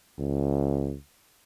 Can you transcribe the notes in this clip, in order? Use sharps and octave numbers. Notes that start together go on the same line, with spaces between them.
C#2